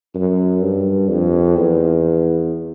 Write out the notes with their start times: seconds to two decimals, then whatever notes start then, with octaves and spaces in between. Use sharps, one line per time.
0.15 F#2
0.62 G2
1.09 F2
1.56 E2